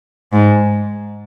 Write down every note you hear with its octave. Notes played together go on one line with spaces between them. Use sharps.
G#2